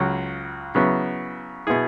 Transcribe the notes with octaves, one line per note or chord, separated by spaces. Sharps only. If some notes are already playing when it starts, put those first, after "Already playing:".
Already playing: C#2 C#3 F#3
C#3 F#3 B3 E4
B2 B3 E4 G#4